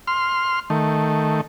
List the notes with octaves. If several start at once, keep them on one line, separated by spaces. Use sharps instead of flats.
C6 F6
D#3 A3